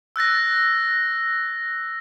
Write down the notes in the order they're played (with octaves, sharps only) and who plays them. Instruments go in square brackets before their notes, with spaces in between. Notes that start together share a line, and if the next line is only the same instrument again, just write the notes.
[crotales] E6 F#6 A6 A#6